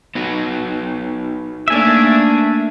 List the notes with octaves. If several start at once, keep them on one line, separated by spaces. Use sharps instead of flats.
B3 D#4 F#4
A3 A#3 D4 E5 G#5